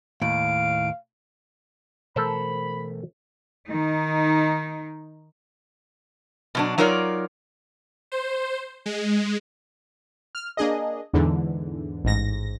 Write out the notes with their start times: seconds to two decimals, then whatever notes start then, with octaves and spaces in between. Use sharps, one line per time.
0.22 D#2 A2 F5 D7
2.16 B2 E3 A3 A4 A#4 C5 B5
3.68 D#3 D#4
6.55 B2 F#3 D4
6.78 F#3 D#4 F4 A#4 C#5 D5
8.12 C5
8.86 G#3
10.35 F6
10.57 A#3 D4 G#4 D#5
11.13 E2 G#2 D3 E3
12.04 A1 G#2 A#6